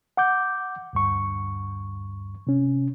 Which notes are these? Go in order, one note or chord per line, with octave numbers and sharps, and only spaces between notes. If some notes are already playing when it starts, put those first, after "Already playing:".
F#5 D6 G6
D2 G2 C#6
C3 C#4